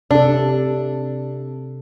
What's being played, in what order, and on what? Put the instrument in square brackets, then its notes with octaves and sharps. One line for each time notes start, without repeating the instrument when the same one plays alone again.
[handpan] C3 A4 [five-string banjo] D4